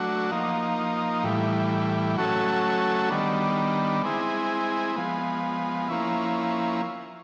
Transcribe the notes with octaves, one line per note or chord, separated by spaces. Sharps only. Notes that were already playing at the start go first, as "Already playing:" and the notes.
Already playing: F#3 A3 D4 F#4
F3 A#3 D#4
A2 E3 G3
F#3 A3 C#4 F#4 A4
D#3 G3 B3 D4
G#3 C4 E4 G#4
F3 G#3 B3
F3 A#3 C#4 E4